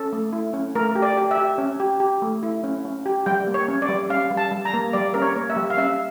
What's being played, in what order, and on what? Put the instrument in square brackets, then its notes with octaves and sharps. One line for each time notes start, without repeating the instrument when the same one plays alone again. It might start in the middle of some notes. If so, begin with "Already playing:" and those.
Already playing: [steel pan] C#4 A4
A3
E4
C#4
A3 A#4
G4
D5
G4
E5
G4
C#4
G4
G4
A3
E4
C#4
C#4
G4
G3 G5
A#3
C#5
C#4
D5
G3
C#4 F5
G3
A5
G3
A#5
A#3
G3 D5
C#4 A#4
C#5
A#3
E5
G3
F5
C#4 E5